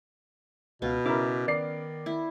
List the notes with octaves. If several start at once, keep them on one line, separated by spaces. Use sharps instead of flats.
C#2 B2 B3 F5
C#3 E4 A#4 D6 F6
D#3 D5 C7
E4